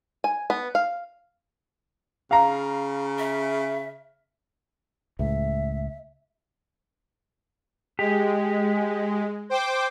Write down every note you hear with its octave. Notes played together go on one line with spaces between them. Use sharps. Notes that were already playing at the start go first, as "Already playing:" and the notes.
G#5
B3
F5
C#3 F5 A#5
E5
C#2 A2 E5
G#3 G4
C5 G5 D6